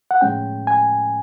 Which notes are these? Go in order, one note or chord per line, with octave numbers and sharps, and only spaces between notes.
F#5
A2 F3 G#3 C#4 G5
G#5